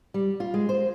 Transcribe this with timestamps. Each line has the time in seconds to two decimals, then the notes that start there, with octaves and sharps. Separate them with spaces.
0.14 G3
0.40 F4
0.54 G#3
0.69 C5